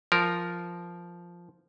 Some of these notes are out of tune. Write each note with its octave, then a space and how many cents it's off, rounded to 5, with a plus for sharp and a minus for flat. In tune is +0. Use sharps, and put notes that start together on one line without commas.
F3 -5 A#4 +0